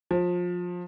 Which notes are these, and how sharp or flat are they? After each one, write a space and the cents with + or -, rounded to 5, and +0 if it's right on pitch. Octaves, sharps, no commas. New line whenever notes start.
F3 +25